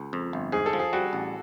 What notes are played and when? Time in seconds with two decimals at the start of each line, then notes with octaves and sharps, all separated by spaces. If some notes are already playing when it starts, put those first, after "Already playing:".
Already playing: C#2
0.13 F2
0.33 G1
0.52 G#2 G#4
0.66 A4
0.73 F3
0.79 G#4
0.93 G3 F#4
1.13 A1